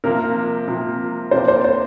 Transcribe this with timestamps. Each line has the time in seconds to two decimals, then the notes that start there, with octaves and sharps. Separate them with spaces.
0.04 C3 F3 A#3 A#4
0.68 C3 F3 A#3
1.31 C3 A#3 D4 G4 C5 D5
1.48 C5
1.64 C5